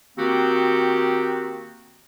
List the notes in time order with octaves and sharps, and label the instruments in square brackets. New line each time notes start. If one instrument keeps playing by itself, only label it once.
[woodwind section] D#3 A#3 C4 F#4 G4